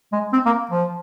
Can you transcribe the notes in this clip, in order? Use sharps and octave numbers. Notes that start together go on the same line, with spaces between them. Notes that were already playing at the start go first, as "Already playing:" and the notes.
G#3
C4
A#3
F3